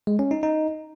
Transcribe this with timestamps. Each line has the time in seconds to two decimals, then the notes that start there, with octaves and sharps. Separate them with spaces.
0.07 G#3
0.19 C#4
0.31 D#4
0.43 D#4